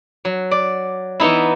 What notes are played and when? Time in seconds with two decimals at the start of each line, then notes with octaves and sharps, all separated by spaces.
0.25 F#3
0.51 D5
1.20 E3 B3 D#4 E4